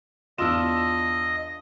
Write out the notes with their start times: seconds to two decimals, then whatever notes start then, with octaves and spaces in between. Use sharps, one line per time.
0.38 E2 D4 F4 D#5 E6 E7